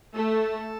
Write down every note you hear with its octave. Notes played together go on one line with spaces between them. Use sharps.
A3 A4